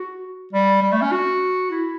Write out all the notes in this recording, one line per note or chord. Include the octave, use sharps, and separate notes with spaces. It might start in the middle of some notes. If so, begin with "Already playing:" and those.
Already playing: F#4
G3
G3
A3
C#4
F#4
E4